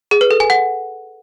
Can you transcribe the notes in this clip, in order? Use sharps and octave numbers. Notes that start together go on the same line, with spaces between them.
G#4
B4
A4
G#5
F#5